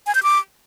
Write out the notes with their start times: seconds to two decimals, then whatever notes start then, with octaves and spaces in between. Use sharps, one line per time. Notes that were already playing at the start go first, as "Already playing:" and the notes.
0.07 G#5
0.15 G6
0.23 D6